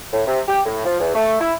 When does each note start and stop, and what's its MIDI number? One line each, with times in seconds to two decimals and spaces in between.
0.12 0.22 45
0.27 0.40 48
0.48 0.60 67
0.66 0.83 45
0.85 1.00 53
1.00 1.13 40
1.15 1.40 57
1.40 1.54 64